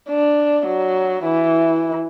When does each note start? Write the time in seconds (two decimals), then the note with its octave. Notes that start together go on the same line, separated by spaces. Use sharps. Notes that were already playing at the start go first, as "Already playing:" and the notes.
0.10 D4
0.67 F#3
1.25 E3